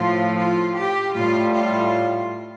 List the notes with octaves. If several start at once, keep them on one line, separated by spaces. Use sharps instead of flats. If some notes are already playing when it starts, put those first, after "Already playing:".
Already playing: A2 F3 F4
F4
G4
A2 G3 F4
F4